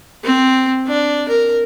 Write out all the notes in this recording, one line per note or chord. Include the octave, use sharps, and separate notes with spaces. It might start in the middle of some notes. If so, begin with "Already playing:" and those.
C4
D4
A#4